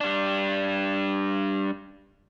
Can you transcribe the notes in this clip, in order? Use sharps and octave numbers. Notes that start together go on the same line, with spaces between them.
G3 D4